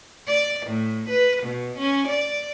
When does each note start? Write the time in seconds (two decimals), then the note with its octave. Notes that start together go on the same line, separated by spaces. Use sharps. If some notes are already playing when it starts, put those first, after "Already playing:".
0.27 D5
0.67 A2
1.09 B4
1.44 B2
1.78 C#4
2.08 D5